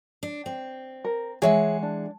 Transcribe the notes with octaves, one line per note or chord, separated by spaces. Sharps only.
D4
C4
A#4
E3 G#3 G#4 C#5 E5 F#5
D4